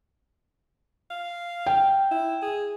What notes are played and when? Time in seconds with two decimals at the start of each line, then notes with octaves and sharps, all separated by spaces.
1.10 F5
1.66 G5
2.11 E4
2.42 G#4